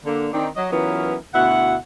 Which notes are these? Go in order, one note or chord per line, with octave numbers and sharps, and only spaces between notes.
D3 A#3
D#3 C4 D4 D#4
F#3 D#5
E3 F#3 B3 C#4 F4 A#4
D2 B2 E4 F#5